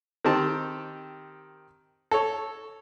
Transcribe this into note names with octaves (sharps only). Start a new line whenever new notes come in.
D#3 C4 G4 A5
A4 C#5